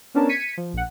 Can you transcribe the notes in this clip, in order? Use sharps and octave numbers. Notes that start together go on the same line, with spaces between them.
B3 C#4 D4 A#4 A5
G#6 B6 C#7 D#7
F3
A#1 F#5